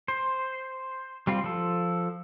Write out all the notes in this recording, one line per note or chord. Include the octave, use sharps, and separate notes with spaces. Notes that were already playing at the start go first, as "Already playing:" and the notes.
C5
G3 C4 F4
F3 A4